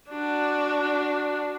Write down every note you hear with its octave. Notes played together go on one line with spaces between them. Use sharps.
D4 F#4